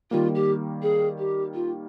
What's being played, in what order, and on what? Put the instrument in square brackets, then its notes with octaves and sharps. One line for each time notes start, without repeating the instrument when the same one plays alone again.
[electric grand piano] D#3 G3 A#3 [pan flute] F4
[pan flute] G4
G#4
G4
F4